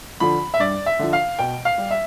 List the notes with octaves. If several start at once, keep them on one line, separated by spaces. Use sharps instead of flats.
D3 F3 B5
E5
G2 D5
E5
D3 F3
F5
B2 G5
F5
G3
E5